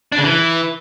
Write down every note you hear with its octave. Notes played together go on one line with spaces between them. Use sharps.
D4
C#3
E3